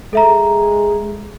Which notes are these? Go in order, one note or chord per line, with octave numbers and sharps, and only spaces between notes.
G#3 A4 E5 A#5